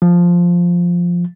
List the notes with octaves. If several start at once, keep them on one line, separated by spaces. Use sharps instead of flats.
F3